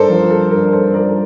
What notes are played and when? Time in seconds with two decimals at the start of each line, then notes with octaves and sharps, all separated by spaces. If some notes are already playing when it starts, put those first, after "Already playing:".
Already playing: G2 A4 A#4 C5 D5
0.10 F3
0.31 A4
0.51 G2 A#4
0.73 A4 C5
0.93 F3 A#4 D5